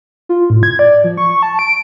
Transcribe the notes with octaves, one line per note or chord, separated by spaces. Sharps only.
F4
A2
G#6
D5
F3
C#6
A5
D7